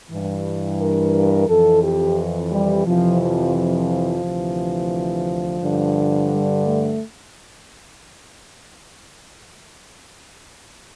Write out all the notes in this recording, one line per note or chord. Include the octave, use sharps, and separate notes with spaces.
G2 E3
A#4
F2 E3 A4
G4
G3
F2 C3 E3 F3
F3
F3
D2 C3 E3
G2 D3
G3
A3